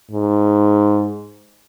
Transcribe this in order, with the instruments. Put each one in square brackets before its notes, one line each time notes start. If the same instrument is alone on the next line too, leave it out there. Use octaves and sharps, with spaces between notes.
[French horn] G#2